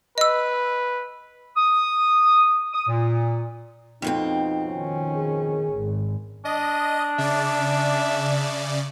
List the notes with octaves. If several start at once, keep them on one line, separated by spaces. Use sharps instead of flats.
B4 D#5 E6
D#6
D#6
A#2
F2 B2 C4 D#4
D#3 C#4
G#4
G#1
D4 D#5
C#3 D5 E5